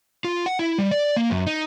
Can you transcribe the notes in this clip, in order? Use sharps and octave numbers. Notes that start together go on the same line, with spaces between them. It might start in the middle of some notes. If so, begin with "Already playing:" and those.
F4
F#5
E4
G3
D5
A#3
F#2
D#4